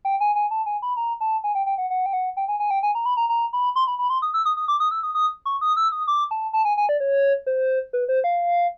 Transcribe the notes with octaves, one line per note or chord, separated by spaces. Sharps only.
G5
G#5
G#5
A5
G#5
B5
A#5
A5
G#5
G5
G5
F#5
F#5
G5
F#5
G5
G#5
G#5
G5
G#5
A#5
B5
A#5
A#5
B5
C6
B5
B5
C6
D#6
E6
D#6
D#6
D6
D#6
E6
D#6
D#6
C#6
D#6
E6
D#6
D6
A5
A5
G#5
G#5
D5
C#5
C5
B4
C5
F5